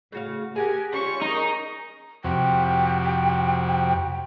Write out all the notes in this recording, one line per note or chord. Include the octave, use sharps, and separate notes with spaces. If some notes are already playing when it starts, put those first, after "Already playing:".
A2 C#3 F#4 F5
G4 G#4 A#4 F#5 G#5
G3 C#4 F4 C5 C#6
D#4 G#4 A#4
F2 C3 F#4 G5